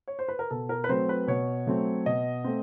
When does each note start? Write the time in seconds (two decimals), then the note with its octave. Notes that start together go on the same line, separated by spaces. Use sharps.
0.08 C#5
0.19 C5
0.28 B4
0.39 A#4
0.50 B2 A4
0.69 A#4
0.84 B4
0.89 F#3 A3 C4 C5
1.09 B4
1.27 B2 C#5
1.67 F#3 A3 C4
2.06 B2 D#5
2.44 A3 C4